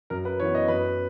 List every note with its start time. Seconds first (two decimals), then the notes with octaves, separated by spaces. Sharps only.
0.10 F#2 A#4
0.25 B4
0.40 E3 B3 C#5
0.55 D#5
0.68 F#2 B4